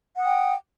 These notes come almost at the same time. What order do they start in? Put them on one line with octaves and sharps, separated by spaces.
F#5 D#6 G5